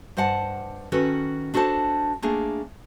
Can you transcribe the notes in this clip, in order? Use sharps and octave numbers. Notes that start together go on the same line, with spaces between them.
G2 C5 D#5 F#5 A5
D#3 C#4 F#4 A4 B4
D4 F#4 A4 C5 A5
A3 A#3 D4 G#4